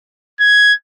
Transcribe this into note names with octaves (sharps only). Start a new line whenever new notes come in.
G#6